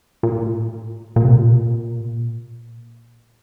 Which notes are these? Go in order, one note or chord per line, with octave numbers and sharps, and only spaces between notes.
A#2
A2
A#2
C3
A#2